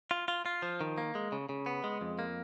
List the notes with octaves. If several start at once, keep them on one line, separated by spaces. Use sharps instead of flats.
F4
F4
F4
F3
D#3
A#3
G#3
C#3
C#3
B3
G#3
F2
A#3